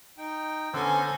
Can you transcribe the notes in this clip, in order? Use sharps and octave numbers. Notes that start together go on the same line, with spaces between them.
D#4 G5
D3 B3 C#4 A4 C5 G#5 A#5